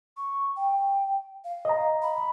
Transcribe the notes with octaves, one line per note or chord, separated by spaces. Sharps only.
C#6
G5
F5
D#5 A#5
B5